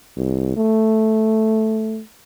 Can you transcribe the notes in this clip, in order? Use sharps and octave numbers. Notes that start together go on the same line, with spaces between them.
C2
A3